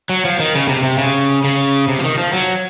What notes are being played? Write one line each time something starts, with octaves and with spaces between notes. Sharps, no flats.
F#3
F3
D#3
C#3
C3
C3
C#3
C#3
C3
F3
D#3
F3
F#3